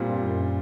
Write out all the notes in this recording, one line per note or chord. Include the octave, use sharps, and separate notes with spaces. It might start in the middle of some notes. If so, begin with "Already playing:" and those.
Already playing: A#2 G3 C4 F4
G2
F#2